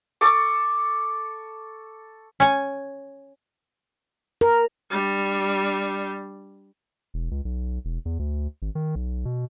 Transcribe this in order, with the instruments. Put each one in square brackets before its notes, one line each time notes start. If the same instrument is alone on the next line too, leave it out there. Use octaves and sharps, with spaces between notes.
[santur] A4 C#6 D6
[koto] C#4 G#5
[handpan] A#4
[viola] G3 D4
[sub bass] E1
C#2
B1
E1
E2
D2
G#1
D#3
B1
B2